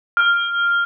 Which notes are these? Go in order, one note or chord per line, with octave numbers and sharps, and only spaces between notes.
F6